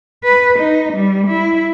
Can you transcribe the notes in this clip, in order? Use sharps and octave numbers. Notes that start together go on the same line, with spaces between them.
B4
D#4
G3
E4